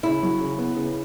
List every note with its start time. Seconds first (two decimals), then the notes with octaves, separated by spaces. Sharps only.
0.03 C#3 E4
0.23 F#3
0.41 C#3
0.59 B3
0.77 C#3